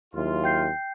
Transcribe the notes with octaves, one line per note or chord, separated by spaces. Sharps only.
D#2 F#3 E4 F4
G5 G6 C7